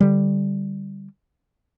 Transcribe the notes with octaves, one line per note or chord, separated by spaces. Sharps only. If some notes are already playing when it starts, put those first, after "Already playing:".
D3 G3